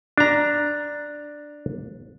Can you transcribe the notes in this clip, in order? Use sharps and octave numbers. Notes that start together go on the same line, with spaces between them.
D4 A#5